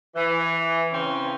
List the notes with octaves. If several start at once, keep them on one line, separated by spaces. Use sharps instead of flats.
E3
C#3 E3 C4 C#4